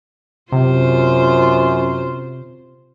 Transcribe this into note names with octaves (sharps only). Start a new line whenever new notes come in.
F#2 C3 F4 C5